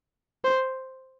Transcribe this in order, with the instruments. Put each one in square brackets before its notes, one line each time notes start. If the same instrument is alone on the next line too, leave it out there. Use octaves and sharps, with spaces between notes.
[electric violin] C5